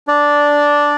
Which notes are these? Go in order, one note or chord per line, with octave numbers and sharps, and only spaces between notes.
D4 D5